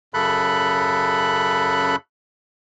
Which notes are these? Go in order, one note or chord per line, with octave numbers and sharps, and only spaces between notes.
F#2 C#3 A4 B5 F#6